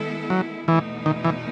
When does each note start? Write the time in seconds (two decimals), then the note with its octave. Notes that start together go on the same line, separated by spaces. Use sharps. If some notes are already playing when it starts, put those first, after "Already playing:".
Already playing: D#3 G#3 B3 E4 A4
0.30 F#3
0.68 E2 B2 E3 A3 D#4
1.06 D#3
1.25 E3